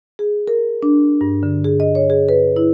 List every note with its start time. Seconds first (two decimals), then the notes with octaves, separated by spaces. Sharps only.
0.19 G#4
0.48 A#4
0.83 D4
1.21 G2
1.43 D3
1.64 G#4
1.80 D#5
1.95 C#5
2.10 G#4
2.29 B4
2.56 E4